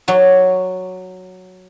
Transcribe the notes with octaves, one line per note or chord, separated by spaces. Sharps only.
F#3 D5